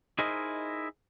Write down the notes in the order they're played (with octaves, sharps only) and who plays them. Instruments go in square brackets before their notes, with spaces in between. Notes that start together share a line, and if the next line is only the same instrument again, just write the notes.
[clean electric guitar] D#4 E4 G#4 A#4 C5 D#5